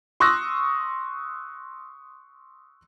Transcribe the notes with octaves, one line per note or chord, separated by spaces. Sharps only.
C6 C#6 D#6 E6 F#6 A#6